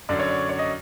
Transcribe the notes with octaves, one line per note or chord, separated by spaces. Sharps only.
F#2 D3 F#3 D5
C#5
D5
C#5
D#5